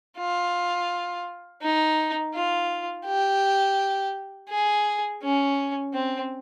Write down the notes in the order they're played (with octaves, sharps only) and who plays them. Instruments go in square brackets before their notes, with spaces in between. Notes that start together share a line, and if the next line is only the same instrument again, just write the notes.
[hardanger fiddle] F4
D#4
F4
G4
G#4
C#4
C4